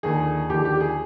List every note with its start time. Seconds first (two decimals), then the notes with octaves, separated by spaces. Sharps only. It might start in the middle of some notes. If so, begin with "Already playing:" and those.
0.03 D#2 D3 F3 G#4
0.49 D#2 D3 F3 G4
0.65 G4
0.80 G#4